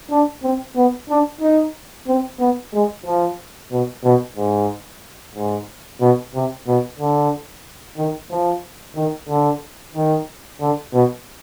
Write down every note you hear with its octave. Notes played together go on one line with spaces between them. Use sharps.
D4
C4
B3
D4
D#4
C4
B3
G#3
F3
B2
B2
G#2
G#2
B2
C3
B2
D3
D#3
F3
D#3
D3
D#3
D3
B2